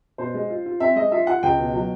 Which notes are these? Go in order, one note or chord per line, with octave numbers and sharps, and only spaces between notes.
B2 C5
G#3
F4
F4
C4 E5
G#3 D#5
F4 E5
F4 F#5
C#2 G5
B2
F#3